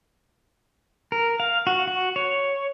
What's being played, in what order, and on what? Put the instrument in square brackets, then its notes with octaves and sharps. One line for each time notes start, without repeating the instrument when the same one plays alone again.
[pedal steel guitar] A#4
F5
F#4
F#4
C#5